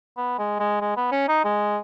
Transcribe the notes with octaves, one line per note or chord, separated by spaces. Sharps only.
B3
G#3
G#3
G#3
B3
C#4
D#4
G#3